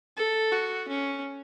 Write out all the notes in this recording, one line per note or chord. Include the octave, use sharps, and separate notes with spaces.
A4
F#4
C#4